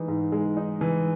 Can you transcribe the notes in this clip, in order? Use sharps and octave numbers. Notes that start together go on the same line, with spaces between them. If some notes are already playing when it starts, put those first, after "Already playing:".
Already playing: E3 G#3 D#4
G#2
G#3
D#4
E3